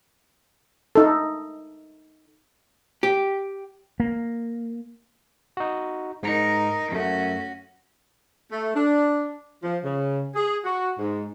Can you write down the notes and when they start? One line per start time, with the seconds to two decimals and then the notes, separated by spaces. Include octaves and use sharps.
0.95 D#4 A4
3.03 G4
4.00 A#3
5.57 D#4 F#4
6.23 G#2 D#4 A#4 A#5 C#7
6.92 F#2 A3 C#4 F#4
8.51 A3
8.74 D4
9.63 F3
9.84 C#3
10.35 G#4
10.65 F#4
10.99 G#2